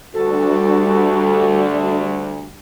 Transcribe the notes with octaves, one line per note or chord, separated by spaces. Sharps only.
D2 G3 D4 F#4 A4